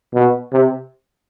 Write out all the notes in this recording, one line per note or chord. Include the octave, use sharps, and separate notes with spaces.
B2
C3